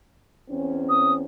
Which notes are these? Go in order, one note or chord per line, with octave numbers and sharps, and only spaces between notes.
E2 C4 C#4
D#6